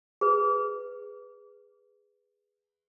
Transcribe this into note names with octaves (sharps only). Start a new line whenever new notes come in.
G#4 B4